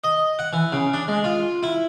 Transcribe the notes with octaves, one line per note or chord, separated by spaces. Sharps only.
D#5
F#5
E3
C#3
D4
G#3
F4
E4